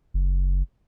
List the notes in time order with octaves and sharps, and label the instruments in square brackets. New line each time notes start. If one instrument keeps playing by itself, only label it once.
[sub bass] F#1